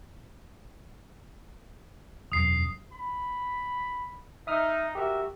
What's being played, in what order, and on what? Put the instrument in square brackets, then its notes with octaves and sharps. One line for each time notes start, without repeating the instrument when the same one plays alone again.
[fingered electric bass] E1 F#2 [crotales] D#6 C7
[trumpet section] B5
[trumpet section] D#4 [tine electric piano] E5 D#6 F6
[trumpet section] F#4 A#4 E5 [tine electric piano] G4